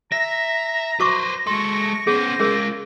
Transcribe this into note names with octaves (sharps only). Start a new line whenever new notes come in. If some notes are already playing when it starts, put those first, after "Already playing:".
E5 A#5 A#6
F#4 B4 C5 C#6 D6
G#3 A4 C6 C#6
B3 C#4 G#4 C5
G#3 C#4 F4 G#4 A#4